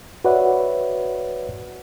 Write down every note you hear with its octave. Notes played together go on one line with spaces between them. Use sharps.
F#4 B4 C#5 D5 E5 F#5